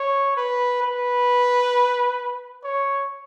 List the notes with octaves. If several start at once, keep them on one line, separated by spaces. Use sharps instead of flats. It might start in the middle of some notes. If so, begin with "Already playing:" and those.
Already playing: C#5
B4
B4
C#5